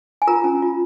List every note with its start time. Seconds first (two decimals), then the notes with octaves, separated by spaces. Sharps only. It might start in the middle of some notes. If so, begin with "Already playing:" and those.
0.22 G#5
0.27 F4 A#4 A#5
0.44 C#4
0.62 F4